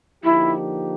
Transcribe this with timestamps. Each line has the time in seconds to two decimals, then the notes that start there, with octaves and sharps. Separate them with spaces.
0.24 D3 F3 A#3 D#4 E4 G4